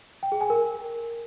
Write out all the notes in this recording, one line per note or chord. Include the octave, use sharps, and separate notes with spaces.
G5
G#4
G#5
A#4